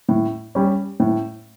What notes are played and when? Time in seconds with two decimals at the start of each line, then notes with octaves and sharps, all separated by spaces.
0.09 A2
0.55 G3 C#4
1.00 A2